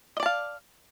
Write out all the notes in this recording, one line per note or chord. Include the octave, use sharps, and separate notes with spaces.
D5 D#5 F5 A5